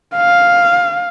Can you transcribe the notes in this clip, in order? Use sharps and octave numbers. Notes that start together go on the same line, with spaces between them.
F5